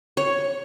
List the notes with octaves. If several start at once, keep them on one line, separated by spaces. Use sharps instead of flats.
C#5